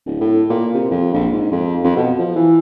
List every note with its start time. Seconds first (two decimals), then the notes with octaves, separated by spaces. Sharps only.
0.06 D1
0.21 A2
0.50 A#2
0.75 C3
0.91 F2
1.14 A#1
1.32 G#2
1.51 F2
1.84 F2
1.96 B2
2.19 F3
2.36 E3